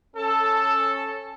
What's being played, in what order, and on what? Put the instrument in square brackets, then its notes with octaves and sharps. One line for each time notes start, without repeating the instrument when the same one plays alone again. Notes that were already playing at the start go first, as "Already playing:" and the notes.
[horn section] C#4 A4